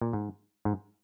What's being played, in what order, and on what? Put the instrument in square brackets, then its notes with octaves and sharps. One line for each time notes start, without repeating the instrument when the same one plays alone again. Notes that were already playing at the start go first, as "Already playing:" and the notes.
[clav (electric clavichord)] A#2
G#2
G#2